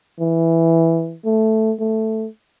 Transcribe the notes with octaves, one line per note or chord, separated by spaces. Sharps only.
E3
A3
A3